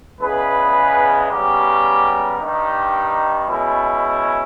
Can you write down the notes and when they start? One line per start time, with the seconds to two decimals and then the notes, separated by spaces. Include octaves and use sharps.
0.21 E2 C#3 G#3 B3 G#4 B4
1.30 C#3 G3 B3 G4 A#4
2.40 G2 D#3 G3 D#4 G4
3.49 B2 G#3 B3 C#4 E4